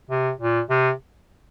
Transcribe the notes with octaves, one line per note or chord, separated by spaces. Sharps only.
C3
A#2
C3